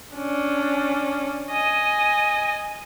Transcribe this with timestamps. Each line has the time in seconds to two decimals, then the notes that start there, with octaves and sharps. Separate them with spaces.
0.15 C#4 D4
1.51 D#5 G#5